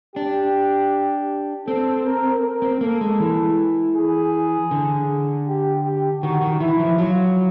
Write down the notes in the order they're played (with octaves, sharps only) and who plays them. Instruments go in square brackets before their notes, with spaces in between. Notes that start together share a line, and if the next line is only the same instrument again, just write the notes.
[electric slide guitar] D4 [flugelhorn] G4
[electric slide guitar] C4 [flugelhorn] A4
[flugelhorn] A#4
A#4
[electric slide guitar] C4
[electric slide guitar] A#3 [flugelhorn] A4
[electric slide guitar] G#3
E3
[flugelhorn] G#4
[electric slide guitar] D3
[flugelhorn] G4
G4
[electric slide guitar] D#3 [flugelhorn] F#4
[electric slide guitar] D#3
[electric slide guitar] E3 [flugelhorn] E4
[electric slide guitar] F3
[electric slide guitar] F#3 [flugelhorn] F4